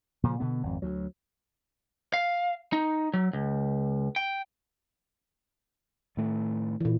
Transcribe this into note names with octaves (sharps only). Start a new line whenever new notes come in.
A#2 C#3 F3
B2 D3 B3
G#1 F2
D2 F#3
F5
D#4
F#3
C#2
G5
A2 D#3 A3
A#2 E3